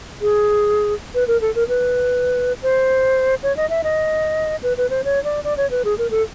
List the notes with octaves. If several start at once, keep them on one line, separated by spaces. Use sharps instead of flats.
G#4
B4
A#4
A4
A#4
B4
C5
C#5
D#5
E5
D#5
B4
B4
C5
C#5
D5
D5
C#5
B4
G#4
A#4
A4